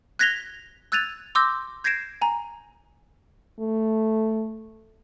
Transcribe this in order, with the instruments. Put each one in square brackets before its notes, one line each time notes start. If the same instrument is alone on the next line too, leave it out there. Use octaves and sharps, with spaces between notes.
[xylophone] F#6 G#6 A#6 B6 F7 G7
E6 F#6 G#6 A6 D#7 F7
C6 D6 E6 G6 A#6
G6 G#6 A#6 C7 D7 E7
G#5 A#5
[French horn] A3